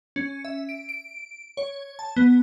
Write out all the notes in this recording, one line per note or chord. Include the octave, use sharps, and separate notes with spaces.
C#4
E5
D7
D7
C#5
A5
B3